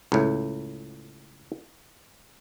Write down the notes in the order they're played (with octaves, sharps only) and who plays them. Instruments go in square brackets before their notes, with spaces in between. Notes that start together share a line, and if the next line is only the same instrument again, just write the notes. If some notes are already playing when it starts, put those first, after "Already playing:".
[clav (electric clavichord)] C#2 A2